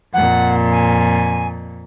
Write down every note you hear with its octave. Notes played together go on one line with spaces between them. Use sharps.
F2 A#2 F#5
G#5